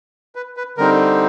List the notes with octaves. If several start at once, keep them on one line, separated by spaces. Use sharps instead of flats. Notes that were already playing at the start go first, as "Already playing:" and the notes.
B4
B4
D3 G3 C4 D#4 A#4